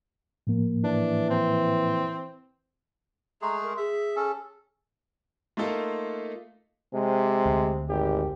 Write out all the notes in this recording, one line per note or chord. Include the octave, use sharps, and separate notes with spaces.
A2 F3 A#3
E3 D4
C4
G#3 A3 G#4 A#5
A#4
G#4 E5
C#4 A4
A3 A#3 D#4 F4 A4
C3 G#3
D2
G#1 G4